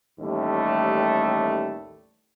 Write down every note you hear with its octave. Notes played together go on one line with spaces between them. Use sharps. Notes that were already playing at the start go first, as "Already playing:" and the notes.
A1 D#2 G3 A3